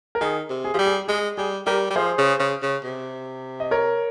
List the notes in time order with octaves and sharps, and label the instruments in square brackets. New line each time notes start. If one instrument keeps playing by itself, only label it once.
[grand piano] A#4
[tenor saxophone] D#3 [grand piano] G#4
[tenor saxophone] C3
[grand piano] G#4
[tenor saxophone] F3 G3 [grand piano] G4
[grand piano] G#4
[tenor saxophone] G#3 [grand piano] G#4
[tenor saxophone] G3 [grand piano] G#4
[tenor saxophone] G3 [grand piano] G4 A#4
[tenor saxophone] G3
[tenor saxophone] F3 [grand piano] G#4 C5
[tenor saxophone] C#3
C#3
C#3
C3
[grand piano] D#5
A#4 C#5